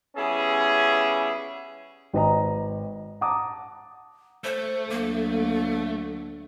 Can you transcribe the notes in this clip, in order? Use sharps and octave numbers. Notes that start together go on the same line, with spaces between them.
G3 B3 C#4 E4 G#4
G#1 B4 D#5 A#5
F#5 A5 A#5 D6 D#6
A3 C5
D2 F#3 A#3